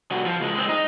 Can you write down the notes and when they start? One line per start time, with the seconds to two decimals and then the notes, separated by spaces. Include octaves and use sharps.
0.11 C2 F#4
0.26 F3
0.41 C#2 G#3
0.54 G#3 C4
0.69 D#4